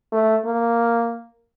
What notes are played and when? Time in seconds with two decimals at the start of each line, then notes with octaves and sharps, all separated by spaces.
0.12 A3
0.46 A#3